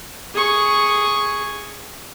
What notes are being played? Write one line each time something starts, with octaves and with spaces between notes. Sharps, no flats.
G#4 C#6